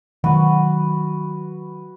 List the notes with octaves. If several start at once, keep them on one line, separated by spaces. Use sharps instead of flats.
D#3 F#3 F#4 B4 C#6